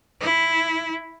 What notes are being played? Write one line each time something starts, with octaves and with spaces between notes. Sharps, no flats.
E4